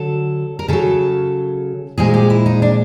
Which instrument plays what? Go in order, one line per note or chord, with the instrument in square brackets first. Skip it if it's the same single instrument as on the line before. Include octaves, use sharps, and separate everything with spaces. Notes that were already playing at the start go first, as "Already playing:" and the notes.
Already playing: [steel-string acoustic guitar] D3 F#3 A4
A#4
C#3 F#3 A4
A#2 F3 G#3 G#4
G4
E4
D#4
D4